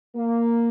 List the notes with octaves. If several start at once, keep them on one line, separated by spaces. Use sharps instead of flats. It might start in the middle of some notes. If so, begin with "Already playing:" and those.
A#3